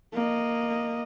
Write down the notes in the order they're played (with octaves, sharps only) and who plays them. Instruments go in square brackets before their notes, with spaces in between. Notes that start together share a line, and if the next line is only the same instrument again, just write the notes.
[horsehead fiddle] A#3 D#5